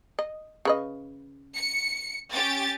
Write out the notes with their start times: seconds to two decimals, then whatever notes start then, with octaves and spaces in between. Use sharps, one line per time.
0.19 D#5
0.65 C#3 B4 D#5
1.55 C#7
2.32 C#4 G4 A6